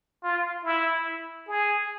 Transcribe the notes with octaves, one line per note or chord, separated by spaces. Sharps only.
F4
E4
G#4